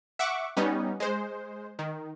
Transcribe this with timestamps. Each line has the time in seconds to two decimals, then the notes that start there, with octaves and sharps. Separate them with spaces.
0.19 E5 F#5 C#6 D6
0.57 G3 B3 C#4 D#4
1.00 G#3 C5
1.79 D#3